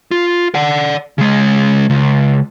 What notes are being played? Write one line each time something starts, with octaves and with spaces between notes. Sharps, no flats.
F4
D5 F#5
C#3 G#3
C#2